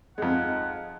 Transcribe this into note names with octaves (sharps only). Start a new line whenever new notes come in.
F2 G#3 D#4 F#5